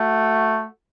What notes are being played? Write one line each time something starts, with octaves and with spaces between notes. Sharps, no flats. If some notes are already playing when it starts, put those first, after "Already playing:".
Already playing: A3 F#4